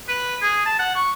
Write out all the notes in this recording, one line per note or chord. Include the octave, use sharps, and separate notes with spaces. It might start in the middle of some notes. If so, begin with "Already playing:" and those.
B4
G#4
A5
F#5
C#6